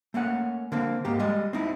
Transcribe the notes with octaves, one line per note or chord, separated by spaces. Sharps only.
A3 A#3 C#4 F#5
D3 A#3 C4
G#2 A#3 G4
G3 G#3 D#5
C4 D#4 E4